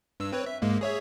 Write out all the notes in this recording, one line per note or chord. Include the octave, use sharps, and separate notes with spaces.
G2 E6
C4 B4 C#5
E5
G#2 G#3 A#3
G#4 C#5 E5